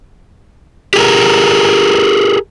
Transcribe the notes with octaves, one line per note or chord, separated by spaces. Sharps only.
G4 G#4 A#4